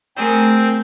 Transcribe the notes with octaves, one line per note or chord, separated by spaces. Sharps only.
A3 C4 G#4 A#4 C5